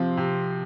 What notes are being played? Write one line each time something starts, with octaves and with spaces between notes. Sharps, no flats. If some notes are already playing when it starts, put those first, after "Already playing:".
Already playing: C3 F3 C4
C3